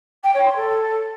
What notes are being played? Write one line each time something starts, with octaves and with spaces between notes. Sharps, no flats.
G5
C#5
C6
A4